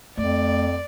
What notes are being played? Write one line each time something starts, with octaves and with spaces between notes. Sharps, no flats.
F2 A3 D5